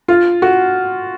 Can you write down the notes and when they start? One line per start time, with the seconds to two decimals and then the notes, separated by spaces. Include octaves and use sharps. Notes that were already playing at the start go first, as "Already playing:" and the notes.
0.08 F4
0.42 F#4